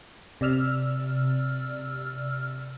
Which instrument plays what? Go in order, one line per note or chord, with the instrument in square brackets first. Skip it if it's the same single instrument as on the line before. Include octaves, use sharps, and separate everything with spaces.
[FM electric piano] C3 D5 E6 F6